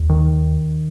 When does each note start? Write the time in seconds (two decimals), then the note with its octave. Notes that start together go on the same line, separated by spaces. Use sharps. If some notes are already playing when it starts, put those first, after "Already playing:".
Already playing: D#2
0.09 D#3